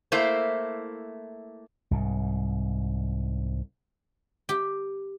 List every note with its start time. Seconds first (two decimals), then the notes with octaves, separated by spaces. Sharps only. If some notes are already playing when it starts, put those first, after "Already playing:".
0.12 A3 A#3 E4 C5
1.91 C2 G#2
4.49 G4